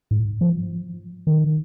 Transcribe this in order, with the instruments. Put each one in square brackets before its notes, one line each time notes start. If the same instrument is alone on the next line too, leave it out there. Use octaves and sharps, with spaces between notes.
[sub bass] G#2
F3
D#3